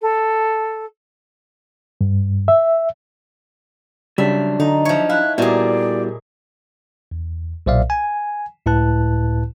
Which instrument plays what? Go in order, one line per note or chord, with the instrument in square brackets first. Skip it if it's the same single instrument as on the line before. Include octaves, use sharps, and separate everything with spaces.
[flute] A4
[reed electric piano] G2
E5
[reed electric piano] C#3 G3 [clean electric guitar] F#3 D4 [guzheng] E5
[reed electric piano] D3 [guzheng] D#4
[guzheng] F3 C#5 [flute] E5
[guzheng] E4 [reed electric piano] F5 [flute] F#6
[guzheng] A#2 G#4 [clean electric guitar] G3 [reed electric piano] B3 E4 F#4 [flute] D5
[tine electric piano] E2
B1 A#2 C5 D5 E5 F5
G#5
C#2 A2 E4 B4 A5 F#6